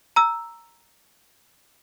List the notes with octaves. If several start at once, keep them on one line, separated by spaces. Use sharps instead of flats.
A#5 E6